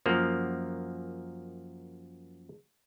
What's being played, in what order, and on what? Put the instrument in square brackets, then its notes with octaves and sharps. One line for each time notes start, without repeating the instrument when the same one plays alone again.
[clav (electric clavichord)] F#2 F3 A#3